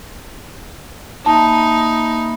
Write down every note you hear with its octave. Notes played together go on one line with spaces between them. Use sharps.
A#3 D#4 E5 A5 B5